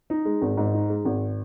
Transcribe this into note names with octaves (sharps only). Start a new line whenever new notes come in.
D#4
G#3
G#1
G#2
D#4
G#3
G#1